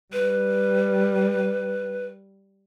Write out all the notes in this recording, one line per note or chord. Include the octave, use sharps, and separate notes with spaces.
G3 B4